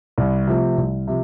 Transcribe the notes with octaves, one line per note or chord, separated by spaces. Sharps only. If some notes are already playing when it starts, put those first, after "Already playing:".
C2
C3 F3 A3 C4
C2
C3 F3